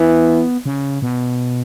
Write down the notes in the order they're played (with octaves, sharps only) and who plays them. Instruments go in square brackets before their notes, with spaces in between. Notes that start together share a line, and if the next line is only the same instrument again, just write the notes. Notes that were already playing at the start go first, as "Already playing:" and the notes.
Already playing: [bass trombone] E3 [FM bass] B3
[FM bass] C#3
B2